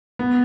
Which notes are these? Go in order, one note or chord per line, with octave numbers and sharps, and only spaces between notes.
B3